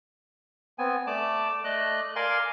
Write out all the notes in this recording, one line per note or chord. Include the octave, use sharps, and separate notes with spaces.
B3 C4 G#5
A3 D5 A5 D6
A3 D5 D#5 F#6
A#4 D5 F5 G#5 C6